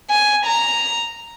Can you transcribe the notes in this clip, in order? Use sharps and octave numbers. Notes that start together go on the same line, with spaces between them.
G#5
A#5